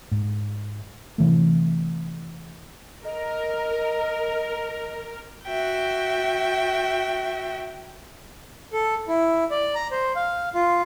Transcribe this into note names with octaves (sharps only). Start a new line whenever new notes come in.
G#2
C3 E3 A3
A#4 D#5
F#4 E5 G5
A4
E4
D5
A#5
C5
F5
F4